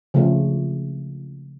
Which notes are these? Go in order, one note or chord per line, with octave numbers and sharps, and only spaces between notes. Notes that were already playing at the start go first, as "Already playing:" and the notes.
C#3 F3 A3